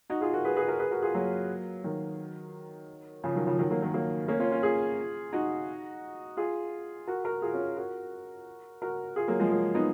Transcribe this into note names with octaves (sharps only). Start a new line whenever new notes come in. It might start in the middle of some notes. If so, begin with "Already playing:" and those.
D#4 F#4
F4 G#4
F#4 A#4
G#4 B4
G#4 B4
F#4 A#4
G#4 B4
F#4 A#4
F4 G#4
F#3 A#3
D#3 F#3
C#3 F3
D#3 F#3
C#3 F3
D#3 F#3
F#3 A#3
D#3 F#3
F#3 A#3
A#3 C#4
C#4 F4
C#4 F4
F4 G#4
D#4 F#4
F4 G#4
F#4 A#4
F#4 A#4
F4 G#4
C#4 F4
F#4 A#4
F#4 A#4
F4 G#4
F#3 A#3
F3 G#3
F#3 A#3
B3 D#4